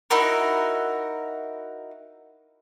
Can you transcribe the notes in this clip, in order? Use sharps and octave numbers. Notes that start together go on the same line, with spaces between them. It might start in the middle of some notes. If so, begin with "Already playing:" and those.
D#4 E4 F#4 A#4